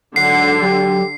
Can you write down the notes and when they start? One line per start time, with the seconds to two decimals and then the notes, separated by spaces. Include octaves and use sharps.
0.16 G#2 D3 F#3 F#5 C7
0.62 F#3 G4